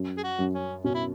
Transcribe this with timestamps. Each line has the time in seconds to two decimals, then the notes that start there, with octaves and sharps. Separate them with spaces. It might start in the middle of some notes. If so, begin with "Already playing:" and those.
Already playing: F#2
0.17 G#4
0.24 F#4
0.39 F#2
0.54 C#4
0.84 B2 C#4
0.94 E4